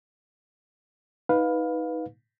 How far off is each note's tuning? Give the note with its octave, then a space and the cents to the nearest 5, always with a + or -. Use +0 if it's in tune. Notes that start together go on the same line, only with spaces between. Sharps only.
D#4 +25 B4 +0 F5 +20